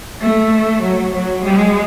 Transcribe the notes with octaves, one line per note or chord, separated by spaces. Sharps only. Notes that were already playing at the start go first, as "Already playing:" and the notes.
A3
F#3
F#3
G#3